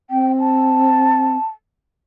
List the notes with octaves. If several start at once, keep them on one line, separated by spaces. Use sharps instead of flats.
C4 G5
A5